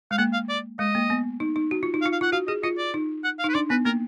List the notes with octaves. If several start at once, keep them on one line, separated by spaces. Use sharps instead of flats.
G#3 F5
A#3 F#5
F5
D5
G#3 D#5
A#3
B3
D#4
D#4
F#4
F4
D#4
F5
F4
F5
F4 F#5
F#4 F5
G#4 D#5
F4 D#5
D5
D#4
F#5
F5
D#4
B4
D4 D5
B3 B4
A#3 A#4